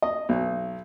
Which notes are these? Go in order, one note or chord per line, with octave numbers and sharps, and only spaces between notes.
D#5
B1